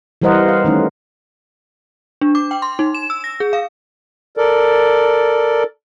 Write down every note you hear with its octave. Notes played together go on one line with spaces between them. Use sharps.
E3 G3 A#4 C5 D#5 F#5
F5
D#3 E3 A3 C#4 D#4
D4
D6
G5
C6
D#4
E7
E6
A#6
G#4
F5
A4 A#4 D5